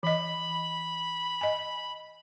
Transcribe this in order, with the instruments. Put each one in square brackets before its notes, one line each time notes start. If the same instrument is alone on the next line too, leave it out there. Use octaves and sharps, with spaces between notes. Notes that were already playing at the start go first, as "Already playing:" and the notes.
[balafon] E3 D#5 [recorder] B5
[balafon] D#5 G#5